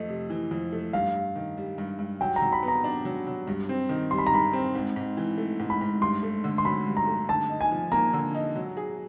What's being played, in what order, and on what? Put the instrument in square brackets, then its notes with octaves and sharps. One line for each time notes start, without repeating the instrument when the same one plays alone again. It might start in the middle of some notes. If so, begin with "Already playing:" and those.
Already playing: [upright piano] F2 A3 [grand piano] D#5
[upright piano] C3
E3
F2
A3
[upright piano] G2 [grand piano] F5
[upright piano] G2
D#3
G3
G2
G2
[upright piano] F#3 [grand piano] G5
[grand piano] A#5
[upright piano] F#3
[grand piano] B5
[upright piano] B3
[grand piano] A#5
[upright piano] D4
F#3
F#3
G2
C4
D#3
[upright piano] G3 [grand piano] C6
[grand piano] B5
A#5
[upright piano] G2 [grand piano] B5
[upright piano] C4
G#2
G#2
E3
A3
G#2
[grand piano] B5
[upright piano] G#2
[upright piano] G2 [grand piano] C6
[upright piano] A3
D3
[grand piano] C6
[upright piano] F#3 [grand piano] B5
[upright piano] G2
[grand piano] A#5
[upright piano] A3
[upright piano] D3 [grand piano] A5
[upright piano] D#4
[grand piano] G#5
[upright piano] F3
[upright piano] A#3 [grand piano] A#5
[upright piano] D3
D#4
F#3
G#4